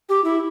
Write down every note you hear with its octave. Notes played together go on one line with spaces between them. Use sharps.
G4
E4